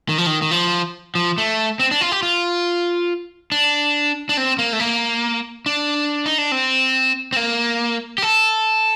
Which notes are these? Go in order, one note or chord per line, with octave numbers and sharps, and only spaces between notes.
D#3
F3
D#3
D#3
F3
F3
A3
C4
D4
F4
G4
F4
D4
D4
C4
A#3
A3
A#3
D4
D#4
D4
C4
C4
A#3
G4
A4